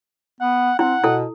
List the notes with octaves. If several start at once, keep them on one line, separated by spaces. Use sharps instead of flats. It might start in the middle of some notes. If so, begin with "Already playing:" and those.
B3 F#5
C4 E4 F#5
B2 E4 A4